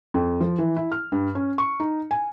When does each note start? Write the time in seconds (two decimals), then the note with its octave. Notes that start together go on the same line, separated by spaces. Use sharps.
0.14 F2
0.40 F3
0.58 E3
0.76 E4
0.92 F6
1.12 G2
1.35 C#4
1.58 C#6
1.80 D#4
2.11 G#5